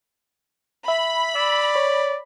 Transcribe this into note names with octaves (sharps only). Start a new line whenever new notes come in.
E5 B5
D5 E6
C#5